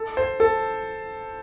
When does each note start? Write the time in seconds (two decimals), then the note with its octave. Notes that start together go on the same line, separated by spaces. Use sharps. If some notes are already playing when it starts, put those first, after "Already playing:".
Already playing: A4
0.17 C5
0.40 A4